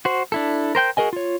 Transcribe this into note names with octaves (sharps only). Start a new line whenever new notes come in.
F#4 C5
D4 E4 A4
A#4 C5 G5 G6
F#4 G#4 A#4 D#5 G#5
F4 C#5